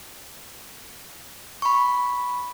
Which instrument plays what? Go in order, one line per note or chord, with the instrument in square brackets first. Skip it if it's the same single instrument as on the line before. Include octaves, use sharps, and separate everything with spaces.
[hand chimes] B5 C#6